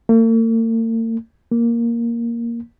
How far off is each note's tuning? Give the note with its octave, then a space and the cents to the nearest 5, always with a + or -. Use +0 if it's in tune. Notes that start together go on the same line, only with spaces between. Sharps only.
A#3 -45
A#3 +5